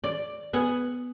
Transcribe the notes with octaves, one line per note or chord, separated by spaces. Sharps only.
D5
B3 F#5 G#5